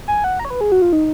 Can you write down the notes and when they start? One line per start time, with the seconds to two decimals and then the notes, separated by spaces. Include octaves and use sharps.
0.08 G#5
0.24 F#5
0.40 A#5
0.45 C#5
0.50 B4
0.61 G#4
0.72 F#4
0.82 F4
0.93 D#4